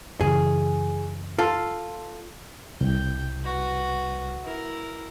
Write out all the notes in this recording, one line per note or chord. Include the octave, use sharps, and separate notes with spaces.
F#2 C#3 E3 G#4
F4 A4
C2 G5
F#4 B4
E4 A#4